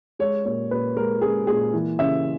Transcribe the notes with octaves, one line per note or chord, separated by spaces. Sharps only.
G#3 C#5
A#2 C#5
A#2 B4
G#3 A#4
G#3 G#4
A#2 G#4
E3
C#3 E5